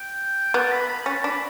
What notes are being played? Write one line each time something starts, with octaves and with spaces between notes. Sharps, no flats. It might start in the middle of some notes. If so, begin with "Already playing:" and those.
Already playing: G5
B3 A5
B5
B5
B5
C#4 A5
D4 B5